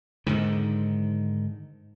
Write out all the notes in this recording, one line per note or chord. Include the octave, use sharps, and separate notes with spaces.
G#2 D3 D#3